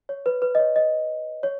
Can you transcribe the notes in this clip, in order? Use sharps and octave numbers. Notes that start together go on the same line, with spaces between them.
C#5
B4
B4
D#5
C#5
D#5
C#5